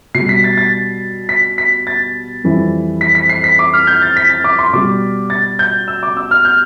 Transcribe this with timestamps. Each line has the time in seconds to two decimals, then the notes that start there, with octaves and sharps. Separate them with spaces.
0.14 B2 C7
0.20 G3
0.29 B6
0.44 A6
0.58 A6
1.29 B6
1.58 B6
1.87 A6
2.44 F2 E3 G3
3.01 B6
3.15 B6
3.29 C7
3.44 B6
3.59 D6
3.73 F6
3.87 G6
4.02 A6
4.17 B6
4.30 A6
4.44 D6
4.59 C6
4.73 B2 G3 D6
5.30 A6
5.59 G6
5.88 E6
6.03 D6
6.17 E6
6.31 F6
6.45 G6